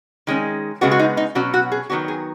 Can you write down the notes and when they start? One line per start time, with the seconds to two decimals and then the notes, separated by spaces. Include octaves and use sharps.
0.27 D#3 G#3 C#4
0.81 C#3 G#3 B3 F#4
0.91 F#4
0.99 D#4
1.17 D#4
1.35 B2 F#3 C#4 F#4
1.54 F#4
1.72 G#4
1.90 D#3 F#3 B3 F#4
2.08 G#4